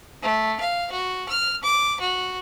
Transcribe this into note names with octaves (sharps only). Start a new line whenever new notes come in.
A3
F5
F#4
F6
D6
F#4